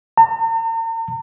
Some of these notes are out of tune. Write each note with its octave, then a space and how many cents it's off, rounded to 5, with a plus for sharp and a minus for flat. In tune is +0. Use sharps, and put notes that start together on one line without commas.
A#5 -45